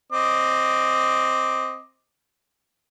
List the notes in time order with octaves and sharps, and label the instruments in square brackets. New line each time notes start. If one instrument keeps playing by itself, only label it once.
[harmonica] C4 D#5 D6